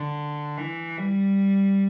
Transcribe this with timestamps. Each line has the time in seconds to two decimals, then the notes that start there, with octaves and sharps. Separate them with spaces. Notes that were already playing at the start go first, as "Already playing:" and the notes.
Already playing: D3
0.57 E3
0.98 G3